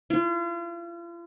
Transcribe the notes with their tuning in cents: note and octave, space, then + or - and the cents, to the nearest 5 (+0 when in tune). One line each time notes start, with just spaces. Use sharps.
F4 -40